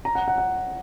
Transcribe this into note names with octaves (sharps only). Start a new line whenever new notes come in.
A#5
F#5
F#5
F#5